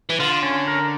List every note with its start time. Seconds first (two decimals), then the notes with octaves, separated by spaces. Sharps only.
0.10 E3
0.20 D3 F4
0.43 C#4
0.68 A#4